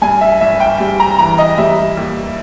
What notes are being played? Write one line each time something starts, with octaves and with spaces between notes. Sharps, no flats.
G2 G#5
E5
G#1 E5
G5
G3
A#5
E3 A#5
D#5
G3 E5
D#2